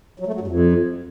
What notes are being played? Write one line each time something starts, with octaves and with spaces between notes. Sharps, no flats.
F#3
A3
F#3
G2
F2